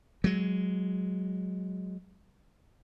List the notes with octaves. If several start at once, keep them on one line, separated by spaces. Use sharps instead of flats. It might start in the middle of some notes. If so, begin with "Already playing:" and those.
F#3 G#3